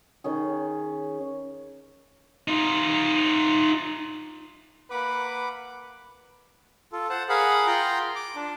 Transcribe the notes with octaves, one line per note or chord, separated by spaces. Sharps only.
D#3 C#4 G#4
D#4 F4
A#3 B4 F#5 B5 D6
F4 A4
C5 F#5 A5
G#4 A#4 F5 F#5 B5
F4 G5 A#5 C6
D6
D4